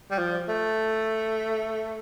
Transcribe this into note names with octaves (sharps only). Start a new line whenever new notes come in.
G3
F3
A3